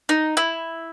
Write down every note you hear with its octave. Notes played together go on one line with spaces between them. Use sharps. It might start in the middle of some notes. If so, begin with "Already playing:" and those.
D#4
E4